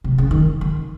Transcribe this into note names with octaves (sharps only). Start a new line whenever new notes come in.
C3
C#3
D#3
D#3